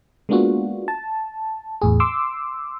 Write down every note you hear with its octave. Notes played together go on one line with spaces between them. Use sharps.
G#3 A#3 B3 D4 F4 F#4
A5
E2 A2 G#4
C6 D6 E6